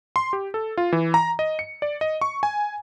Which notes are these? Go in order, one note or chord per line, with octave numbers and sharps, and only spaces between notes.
C6
G4
A4
F4
E3
A#5
D#5
C#7
D5
D#5
C#6
G#5